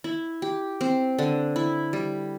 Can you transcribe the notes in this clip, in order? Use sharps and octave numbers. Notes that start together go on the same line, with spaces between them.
E4
G4
C4
D3
E4
G3